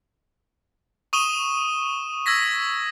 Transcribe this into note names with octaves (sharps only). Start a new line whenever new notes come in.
C#6 D#6 D#7 E7 G7
E6 G#6 A#6 B6